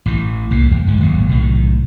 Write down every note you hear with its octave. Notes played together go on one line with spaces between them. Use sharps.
A1 A2 E3
C2 F#2 A#2 A#3
E2
F2 G#2 D3 F3
D1 G#1 D#2 F#3
B1 A2 C3 D#3